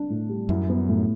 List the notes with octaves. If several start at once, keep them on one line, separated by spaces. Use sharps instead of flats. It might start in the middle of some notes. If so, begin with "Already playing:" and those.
Already playing: D4
A2
G3
F#2 E4
B3
A2